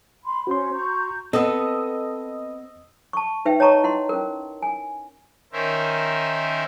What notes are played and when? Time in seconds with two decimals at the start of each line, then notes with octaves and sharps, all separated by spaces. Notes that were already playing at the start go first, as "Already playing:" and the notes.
0.25 B5 C6
0.47 C#4 F#4 C5 C6
0.73 A#5 C#6 G6
1.33 B3 C4 A4 D#5 D#6 E6
3.13 A5 C#6
3.45 D#4 B4 E5 G5
3.60 C#5 D#5 A5 A#5 C#6
3.84 E4 F#5 C6
4.09 C#4 A#4
4.62 G#5
5.53 D#3 C#4 A#4 C5 E5